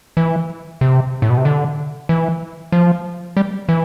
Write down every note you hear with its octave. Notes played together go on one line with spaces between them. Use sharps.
E3
C3
A2
B2
C3
D3
E3
F3
G3
E3